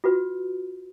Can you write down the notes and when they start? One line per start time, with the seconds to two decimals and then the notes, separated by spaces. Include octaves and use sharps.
0.04 F4 F#4 B4